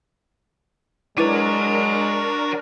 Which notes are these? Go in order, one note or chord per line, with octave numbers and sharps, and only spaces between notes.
G#3 D4 E4 F#4 A#4 B4 C#5